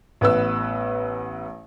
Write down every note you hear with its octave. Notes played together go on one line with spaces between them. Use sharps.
A1 B3 B4 E6